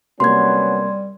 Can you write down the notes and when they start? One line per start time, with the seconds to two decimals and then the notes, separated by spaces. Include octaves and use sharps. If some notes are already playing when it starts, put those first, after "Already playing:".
0.20 C3 F#3 G3 A#3 B3 C#4 C6 G#6